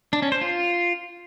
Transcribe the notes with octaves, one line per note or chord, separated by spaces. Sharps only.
D4
C#4
C5
F4